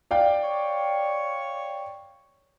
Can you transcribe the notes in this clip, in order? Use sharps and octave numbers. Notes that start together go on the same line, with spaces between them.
D5 F5 G5
C#5